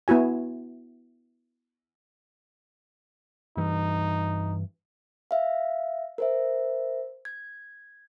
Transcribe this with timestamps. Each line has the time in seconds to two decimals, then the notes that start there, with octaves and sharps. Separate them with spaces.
0.08 B3 E4 F#4 G#5
3.57 G2 E3 D#4
5.31 E5 F5
6.18 A#4 C5 E5
7.25 G#6